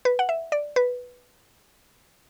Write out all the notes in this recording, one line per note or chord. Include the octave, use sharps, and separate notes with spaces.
B4
F#5
E5
D5
B4